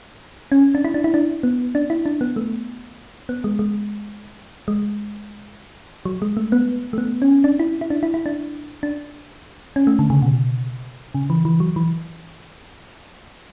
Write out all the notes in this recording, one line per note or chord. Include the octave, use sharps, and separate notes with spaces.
C#4
D4
E4
D4
E4
D4
B3
D4
E4
D4
B3
A3
B3
G#3
G#3
G#3
F#3
G#3
A3
B3
A3
B3
C#4
D4
E4
E4
D4
E4
E4
D4
D4
C#4
A3
D3
C#3
B2
C#3
E3
E3
F#3
E3